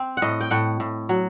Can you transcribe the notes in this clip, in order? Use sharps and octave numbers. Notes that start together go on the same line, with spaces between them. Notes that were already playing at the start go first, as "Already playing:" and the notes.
Already playing: C4
F#5
A2 D#5
G5
A2 F#5
A2
F#3